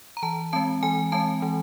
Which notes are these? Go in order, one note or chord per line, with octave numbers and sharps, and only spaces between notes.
A#5
E3 A5
G#3 C4 A5
E3 G#5
G#3 C4 A5
E3